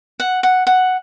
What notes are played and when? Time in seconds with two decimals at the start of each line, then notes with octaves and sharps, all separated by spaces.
0.20 F#5
0.43 F#5
0.67 F#5